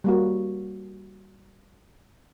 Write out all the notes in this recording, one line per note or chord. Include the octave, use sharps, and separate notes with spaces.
G3 A#3 F#4